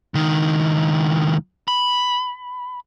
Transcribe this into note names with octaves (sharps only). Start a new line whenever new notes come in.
C#2 D#3
B5